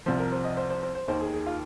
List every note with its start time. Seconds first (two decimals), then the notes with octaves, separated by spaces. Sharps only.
0.06 C2 C3 F3 C5
0.19 A#4
0.32 C5
0.45 D#5
0.57 C5
0.70 C5
0.83 C5
0.95 C5
1.08 D#2 D#3 C5
1.20 G#4
1.33 G#4
1.46 F4